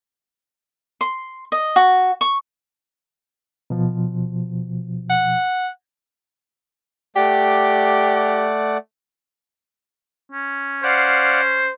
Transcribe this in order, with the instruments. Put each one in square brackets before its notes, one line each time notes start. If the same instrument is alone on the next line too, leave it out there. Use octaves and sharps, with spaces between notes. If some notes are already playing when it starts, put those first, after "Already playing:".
[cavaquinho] C6
D#5
F#4
C#6
[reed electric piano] B2 F3
[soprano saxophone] F#5
[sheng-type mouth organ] A3 D5 F#5 [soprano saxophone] G4
[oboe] C#4
[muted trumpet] C5 [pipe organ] D5 F5 F#5